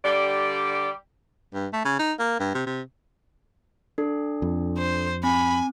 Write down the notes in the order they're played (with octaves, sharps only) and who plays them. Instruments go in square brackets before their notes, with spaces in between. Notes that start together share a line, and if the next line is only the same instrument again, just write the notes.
[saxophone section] D3 G3 G4 D5
[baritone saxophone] G2
A3
C#3
D#4
A#3
G2
C3
C3
[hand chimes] D4 A4
[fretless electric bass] F2
[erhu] C5
[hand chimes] C4 [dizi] G#5 [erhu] B5